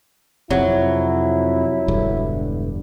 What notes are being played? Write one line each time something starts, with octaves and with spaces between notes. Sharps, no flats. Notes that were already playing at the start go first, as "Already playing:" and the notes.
F2 C3 F#3 E4
E1 G2 D3